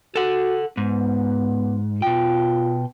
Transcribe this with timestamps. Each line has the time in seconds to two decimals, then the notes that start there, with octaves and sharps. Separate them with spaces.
0.16 F#4 A4 F#5
0.77 G#2 B3
2.02 B2 F4 G5